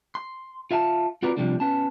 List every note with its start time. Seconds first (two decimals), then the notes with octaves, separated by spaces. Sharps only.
0.15 C6
0.71 F4 E5 F5 A5
1.23 C4 F4 F#4 A#4 B4 D5
1.37 C3 D#3 F3 G3 A#3 D4
1.60 B3 C#4 A5